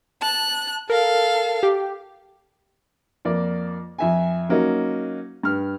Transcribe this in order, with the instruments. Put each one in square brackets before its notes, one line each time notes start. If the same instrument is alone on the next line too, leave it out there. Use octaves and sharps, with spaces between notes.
[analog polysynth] A5 [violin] F#6
[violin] A4 F5 [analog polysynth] A#4
[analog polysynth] G4
[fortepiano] F2 A#3 D5
F2 E5 G#5
F#3 A#3 C#4 D#4
G2 F6